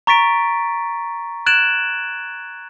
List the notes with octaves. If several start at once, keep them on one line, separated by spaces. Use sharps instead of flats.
A#5 C#6 A6 B6 D7
F#6 G#6 A6 D7 E7 F#7